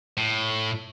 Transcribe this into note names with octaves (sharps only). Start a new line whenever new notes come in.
A2